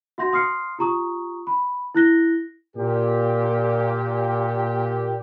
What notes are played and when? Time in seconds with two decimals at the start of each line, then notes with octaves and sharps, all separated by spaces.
0.18 F#4 E5 F#5 C6 G6 A#6
0.32 F5 C6 D#6 F6 C7 C#7
0.79 F4 G4 A#5 C#6 D#6
1.47 B5
1.95 E4 F#6 A#6 G7
2.77 A#2 G4